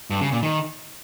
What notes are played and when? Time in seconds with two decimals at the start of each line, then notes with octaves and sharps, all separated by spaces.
0.10 G2
0.21 C#3
0.32 A#2
0.43 D#3